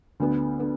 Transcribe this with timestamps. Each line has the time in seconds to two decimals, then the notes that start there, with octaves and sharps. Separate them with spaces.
0.20 D2 D3 B3
0.59 D3 B3